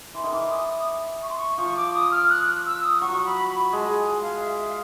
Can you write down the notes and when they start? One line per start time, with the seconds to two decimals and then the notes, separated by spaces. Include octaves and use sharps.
0.14 E3 C6
0.24 D#3
0.33 E3 D6
0.50 D#6
0.68 D#6
1.23 C#6
1.30 C6
1.38 C#6
1.58 F3 C#6
1.76 D6
1.94 D#6
2.11 F6
2.30 F#6
2.66 E6
2.83 D#6
3.01 F#3 C#6
3.25 B5
3.49 B5
3.73 G#3 A5
3.97 G#5
4.21 F5
4.45 E5
4.57 E5
4.68 F5